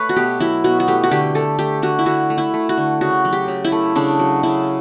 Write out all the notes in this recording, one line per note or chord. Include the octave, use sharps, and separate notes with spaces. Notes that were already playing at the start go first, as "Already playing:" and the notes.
Already playing: A3 B4 C#5
F#4
B2 G4
F#3 E4
B2 F#4
F#4
A3 G4
F#4
D3 G4
A3 A4
A3 G4
D3 F#4
E4
D3 F#4
A3
E4
A3
F#4
D3
C#3 F#4
F#3
G4
C#3
E4
A3
C#3 D4
F#3
C#3 E4